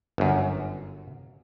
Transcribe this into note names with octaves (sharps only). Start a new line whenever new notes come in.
G1 F#2